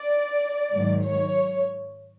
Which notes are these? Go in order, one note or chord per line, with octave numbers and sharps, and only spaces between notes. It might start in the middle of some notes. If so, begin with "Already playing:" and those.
Already playing: D5
G#2 D#3 F#3
C#5